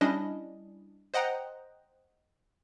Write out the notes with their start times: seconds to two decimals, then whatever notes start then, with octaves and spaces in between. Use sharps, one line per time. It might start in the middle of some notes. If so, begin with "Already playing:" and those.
0.01 G3 C#4 D4 E4 D#5
1.14 C5 D#5 F#5 G5 A#5